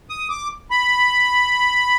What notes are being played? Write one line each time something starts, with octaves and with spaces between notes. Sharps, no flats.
D#6
D6
B5